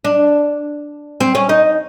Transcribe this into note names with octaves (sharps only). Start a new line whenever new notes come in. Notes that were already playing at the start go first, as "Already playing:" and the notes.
D4
C4
C#4
D#4